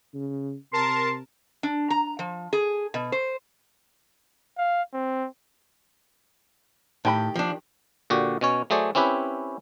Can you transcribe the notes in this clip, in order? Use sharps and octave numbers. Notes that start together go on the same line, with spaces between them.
C#3
C3 A#4 A5 C6
D4
A#5
F3
G#4
B2
C5
F5
C4
A2 D#3 G4 B5
F3 D4
A#2 D3 F#4 G4
B2 C#4 C#5
F#3 A3 G#4 C5 D5
C4 C#4 E4 G4 B4 C#5